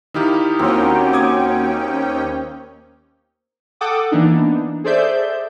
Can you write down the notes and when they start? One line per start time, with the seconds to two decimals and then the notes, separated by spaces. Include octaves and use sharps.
0.14 D#3 D#4 E4 G4 F5
0.59 D#2 A#3 C4 C#4 F#4 A#4 G5
1.13 D6 D#6 G#6
3.81 A4 F#5 G5 D6 D#6
4.12 E3 A#3 B3 D4 D#4
4.84 G#4 A4 C5 D5 E5 G6